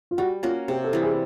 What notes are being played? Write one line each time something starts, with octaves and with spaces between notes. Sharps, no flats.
F4
G3 F#4
A#3 C#4 F4 F#4
C3 G4
A4
E3 G3
G#4